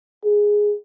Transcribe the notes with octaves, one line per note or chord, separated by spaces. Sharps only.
G#4